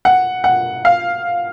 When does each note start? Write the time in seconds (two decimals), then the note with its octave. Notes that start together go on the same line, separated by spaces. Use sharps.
0.05 F#5
0.44 F#5
0.85 F5